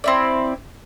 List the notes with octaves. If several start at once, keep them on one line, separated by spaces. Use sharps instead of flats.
C4 E4 D5